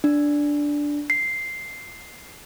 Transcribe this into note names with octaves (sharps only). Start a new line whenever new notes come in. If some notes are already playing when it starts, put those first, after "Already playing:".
D4
C7